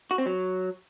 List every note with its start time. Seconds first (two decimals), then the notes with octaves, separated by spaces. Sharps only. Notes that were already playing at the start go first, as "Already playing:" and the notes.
0.11 F#4
0.18 C4
0.26 F#3